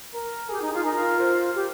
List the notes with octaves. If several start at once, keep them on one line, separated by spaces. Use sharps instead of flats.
A#4
G4 G#4
D#4
F4
D#4 A#4
F4
C5
G4